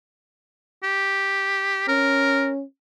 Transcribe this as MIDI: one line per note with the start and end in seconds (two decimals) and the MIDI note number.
0.83 1.87 67
1.88 2.63 61
1.88 2.50 70